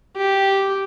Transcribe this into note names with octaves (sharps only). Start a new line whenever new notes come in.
G4